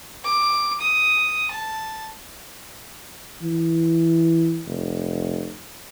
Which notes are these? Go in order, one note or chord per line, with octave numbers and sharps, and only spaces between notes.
D6
D#6
A5
E3
F1